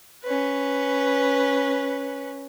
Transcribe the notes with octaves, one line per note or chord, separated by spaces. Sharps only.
C#4 B4